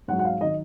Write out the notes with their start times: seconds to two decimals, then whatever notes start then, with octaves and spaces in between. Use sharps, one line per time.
0.08 G#2 F#5
0.12 F#3
0.19 F#5
0.25 F5
0.41 D#3 F#3 D#5